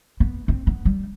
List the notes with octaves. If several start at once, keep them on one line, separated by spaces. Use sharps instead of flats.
B3
C4
B3
G3